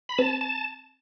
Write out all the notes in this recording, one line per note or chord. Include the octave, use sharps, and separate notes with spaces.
B5
C4 A5
A5